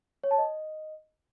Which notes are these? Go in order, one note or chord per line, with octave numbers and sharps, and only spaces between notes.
C#5
A5
D#5